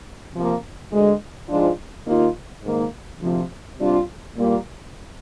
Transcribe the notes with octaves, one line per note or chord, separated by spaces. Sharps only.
C3 F3 A#3
D2 D3 G#3
G#2 F3 G#3 D4 F4
D#2 D#3 A#3 F4
G#2 D#3 A#3 D#4
D2 C3 F3
C3 G3 D4 F4
A#2 G3 A#3 F4